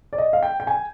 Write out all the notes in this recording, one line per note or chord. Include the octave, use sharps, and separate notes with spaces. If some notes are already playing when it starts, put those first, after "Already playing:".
D5
D#5
F5
G5
G5
G#5